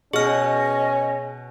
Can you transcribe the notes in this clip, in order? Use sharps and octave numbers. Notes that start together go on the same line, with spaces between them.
B2 C#4 G#4 D#5 F6